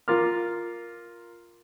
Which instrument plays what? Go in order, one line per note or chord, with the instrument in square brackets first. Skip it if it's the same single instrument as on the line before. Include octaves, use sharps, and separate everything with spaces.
[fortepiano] F4 A#4 D6 F6